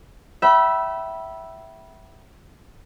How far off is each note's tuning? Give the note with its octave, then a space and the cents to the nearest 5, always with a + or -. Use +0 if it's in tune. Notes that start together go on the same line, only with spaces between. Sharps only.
E5 +0 G5 -40 B5 -20